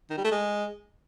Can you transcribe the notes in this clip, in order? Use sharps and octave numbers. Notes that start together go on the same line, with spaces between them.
D#3
G3
A3
G#3